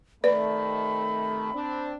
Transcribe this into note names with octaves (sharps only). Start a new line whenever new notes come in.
C3 D#3 A3 B4 D5 B5
C4 D4